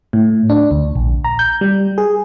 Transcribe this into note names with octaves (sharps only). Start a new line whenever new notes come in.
A2
D4
D2
A#1
A#5
G6
G3
G#4